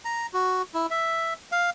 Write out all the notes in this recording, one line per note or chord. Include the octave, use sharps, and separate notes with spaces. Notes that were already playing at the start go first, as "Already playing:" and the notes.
A#5
F#4
E4
E5
F5